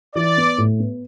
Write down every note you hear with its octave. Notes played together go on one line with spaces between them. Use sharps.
E3 D5
B3
A2
B3